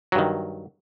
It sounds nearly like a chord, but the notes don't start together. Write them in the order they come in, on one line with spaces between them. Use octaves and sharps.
F#3 G2 D#3